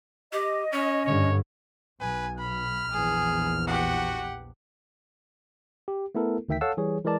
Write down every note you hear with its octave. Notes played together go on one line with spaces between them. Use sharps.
G4 D#5
C#4 C#5
G2 D3 C#5
B1 B4 G#5
B5 F6
A#1 E2 G#4
F#4 G4 F#5
G4
A3 B3 E4 A4 A#4
D2 D#3 E5 G5 B6
A4 C#5 F5 F#5 A5 E6
E3 G3 G#4 C#5
E3 G#3 A#4 D5 A5